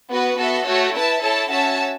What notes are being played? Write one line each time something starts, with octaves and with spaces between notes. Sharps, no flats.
B3 F#4 B4
B3 F#4 A4 E5
A3 F#4 C#5
E4 B4 E5 A5
E4 A4 C#5 A5
C#4 F#4 C#5 E5 A5